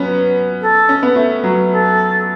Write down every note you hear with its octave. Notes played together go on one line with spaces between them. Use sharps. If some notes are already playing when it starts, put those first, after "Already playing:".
Already playing: F#3 B3 C#4
A4
C#4
B3
A3
F#3
A4